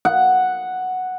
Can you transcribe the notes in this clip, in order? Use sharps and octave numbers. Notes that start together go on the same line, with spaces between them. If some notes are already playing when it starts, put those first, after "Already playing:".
F#5